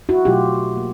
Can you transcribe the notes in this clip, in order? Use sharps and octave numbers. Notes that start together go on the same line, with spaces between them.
E4 F#4
B2 F#3 A3 F4 G4
A#3